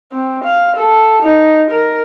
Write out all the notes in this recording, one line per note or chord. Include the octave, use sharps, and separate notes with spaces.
C4
F5
A4
D#4
A#4